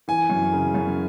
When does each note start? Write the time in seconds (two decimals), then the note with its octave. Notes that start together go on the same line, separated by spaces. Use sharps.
0.08 E3 G#5
0.30 F#2
0.53 C#3
0.74 F#2